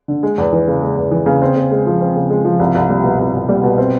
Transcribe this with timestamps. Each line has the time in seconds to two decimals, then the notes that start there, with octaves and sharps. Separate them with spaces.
0.08 D3
0.23 G#3
0.38 E2
0.53 E3
0.68 C#3
0.83 G#3
0.97 E2
1.11 E3
1.26 C#3
1.42 C4
1.55 C#3
1.71 G#3
1.86 F3
2.01 C4
2.16 C#3
2.30 G#3
2.45 F3
2.60 C2
2.75 C2
2.89 G3
3.04 B2
3.19 C2
3.33 C2
3.49 G3
3.64 B2
3.78 C4